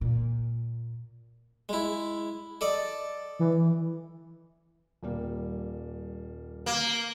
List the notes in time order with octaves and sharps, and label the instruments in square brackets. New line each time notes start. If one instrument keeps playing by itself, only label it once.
[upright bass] A#2
[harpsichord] G#3 E4
A4 D5 D#5
[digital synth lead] E3
[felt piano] D#1 G3 A#3
[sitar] A#3